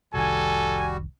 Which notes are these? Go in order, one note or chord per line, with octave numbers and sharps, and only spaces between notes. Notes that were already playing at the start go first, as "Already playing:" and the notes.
F1 C2 D#3 G3 F#4 A4 G#5